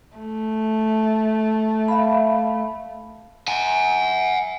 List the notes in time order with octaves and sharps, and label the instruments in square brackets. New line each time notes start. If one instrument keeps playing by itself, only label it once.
[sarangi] A3
[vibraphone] E5 F5 B5
[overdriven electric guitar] F#5 G#5